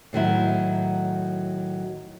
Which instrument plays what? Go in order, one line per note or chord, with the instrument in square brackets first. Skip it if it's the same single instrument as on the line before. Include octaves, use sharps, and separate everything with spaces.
[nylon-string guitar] A2 D#3 F#3 E4